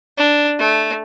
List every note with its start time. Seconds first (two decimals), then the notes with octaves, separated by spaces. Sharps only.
0.18 D4
0.59 A3